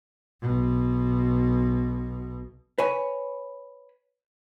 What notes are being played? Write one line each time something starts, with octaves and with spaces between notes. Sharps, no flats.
B1 B2
B4 C#5 G#5